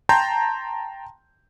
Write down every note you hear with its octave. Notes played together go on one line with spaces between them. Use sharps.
G5 A5 A#5 C6 G6